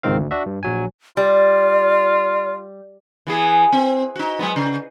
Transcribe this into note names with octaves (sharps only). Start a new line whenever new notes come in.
G#1 C#2 G#2 D#3 C4 F5
D2
D4 F#4 E5
G2
A#1 F#3 G#5
G3 F4 D5
E3 B3 G#4
C4
D#4 F#4
F#3 G#3 B3
C#3